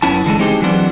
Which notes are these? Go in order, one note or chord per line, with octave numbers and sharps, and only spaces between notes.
F#2 B3 C#4 E4 A5
D3 E3 G#3 A5
G#3 C4 D#4 G4 G#4
E3 F#3 G3 B3 C4 D4